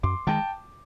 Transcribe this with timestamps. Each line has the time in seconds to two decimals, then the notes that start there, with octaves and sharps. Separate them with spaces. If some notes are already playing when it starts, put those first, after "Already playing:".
0.03 F#2 C6 D6
0.27 D#3 G#3 G5 A5